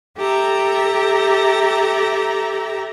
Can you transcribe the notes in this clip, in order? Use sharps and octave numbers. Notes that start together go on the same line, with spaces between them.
G4 A4 E5 A#5